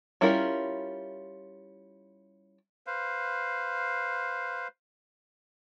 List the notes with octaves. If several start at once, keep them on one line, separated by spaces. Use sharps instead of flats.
G3 C#4 E4 F4 A#4
B4 C5 F5